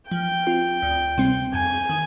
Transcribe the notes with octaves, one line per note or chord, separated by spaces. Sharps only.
F3 G5
C4 F4
D2
C3 G3 C4
F2 G#5
D#3